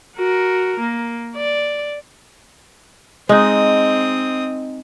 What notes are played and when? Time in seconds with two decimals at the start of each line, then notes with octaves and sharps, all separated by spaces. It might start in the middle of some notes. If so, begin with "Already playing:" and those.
0.16 F#4 A#4
0.80 A#3
1.36 D5
3.29 G#3 C4 D#4 D#6